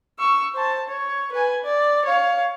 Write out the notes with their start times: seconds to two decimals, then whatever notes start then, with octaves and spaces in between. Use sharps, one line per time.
0.19 C#6 E6
0.54 C5 A5
0.88 C#5
1.32 B4 G#5
1.64 D5
2.05 C#5 F5